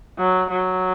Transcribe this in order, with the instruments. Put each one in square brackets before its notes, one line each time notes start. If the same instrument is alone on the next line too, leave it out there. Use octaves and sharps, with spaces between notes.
[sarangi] F#3
F#3